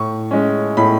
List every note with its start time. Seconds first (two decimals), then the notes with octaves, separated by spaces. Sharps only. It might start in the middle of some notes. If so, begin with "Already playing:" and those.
Already playing: A2 C#6
0.31 G#3 C#4
0.77 A2 B5